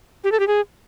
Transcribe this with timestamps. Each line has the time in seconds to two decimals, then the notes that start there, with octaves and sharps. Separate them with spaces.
0.24 G4
0.32 A4
0.40 G4
0.47 G#4